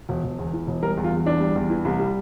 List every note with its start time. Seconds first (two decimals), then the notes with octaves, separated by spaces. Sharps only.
0.09 E1
0.24 E1
0.39 E2
0.53 E3
0.67 E1
0.82 G3 A#4
0.97 E2
1.04 F4
1.12 E2
1.26 E3 D4
1.41 G3
1.56 E2
1.70 E3
1.85 C2
1.99 G3